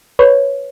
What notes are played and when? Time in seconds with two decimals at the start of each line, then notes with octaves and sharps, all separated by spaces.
0.19 B4 C#5